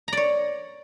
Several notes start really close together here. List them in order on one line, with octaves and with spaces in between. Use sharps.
A#5 D5 C#5